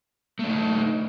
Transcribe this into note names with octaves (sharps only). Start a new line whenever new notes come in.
A3 D4 D#4